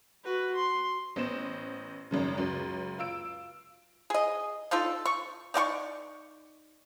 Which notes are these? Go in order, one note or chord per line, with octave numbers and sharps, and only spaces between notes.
F#4 B4
C6
A1 B3 C5 E7
G#1 F#2 C#3
C#2 F#2 F#3
F4 E6 D7
G#4 D#5
D4 D#4 F4 A4
C#6
D#4 D5 F#5 C#6